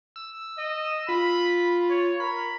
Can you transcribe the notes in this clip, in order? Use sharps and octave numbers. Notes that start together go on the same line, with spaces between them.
E6
D#5
F4 B5
C#5
A#4 B5